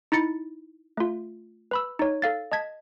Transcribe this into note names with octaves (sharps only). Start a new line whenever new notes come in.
D#4 E4 A6 C#7
A3 F4
B4 B5 E6
D#4 C#5
A4 F5 A6
D#5 A5 G#6 B6